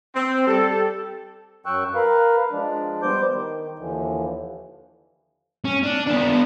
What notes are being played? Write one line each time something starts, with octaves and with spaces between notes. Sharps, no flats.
C4
G3 G4 A4
F#2 F#3 G5 C#6 E6 F#6
A#4 B4 F5
F3 G#3 D4
G3 B3 C5 D6 G6
D#3
D#2 D3 E3 F3
C#4
D4
B3 D4